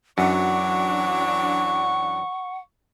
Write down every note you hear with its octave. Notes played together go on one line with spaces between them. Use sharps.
F#2 E3 F#3 D4 F#5 C#6